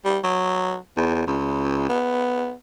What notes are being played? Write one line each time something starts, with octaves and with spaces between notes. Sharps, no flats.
G3
F#3
E2
C#2
B3